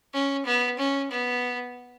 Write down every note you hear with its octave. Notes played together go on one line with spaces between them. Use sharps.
C#4
B3
C#4
B3